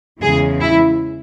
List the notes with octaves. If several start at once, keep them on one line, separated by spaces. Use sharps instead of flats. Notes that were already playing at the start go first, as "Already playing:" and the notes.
E2 C#3 E3 G#3 G#4
E4